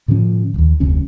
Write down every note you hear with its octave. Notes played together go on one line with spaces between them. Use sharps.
A2 D3 F3 C#4
D#1 D#2
F1 D2 C#4